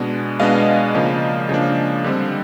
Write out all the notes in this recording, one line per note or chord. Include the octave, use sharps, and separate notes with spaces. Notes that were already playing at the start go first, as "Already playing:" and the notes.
Already playing: B2 G#3 B3 D4
B2 G#3 B3 D4 D#5 F5
C#3 F3 A#3 D4
C#3 F3 A#3 D4
D3 G3 C4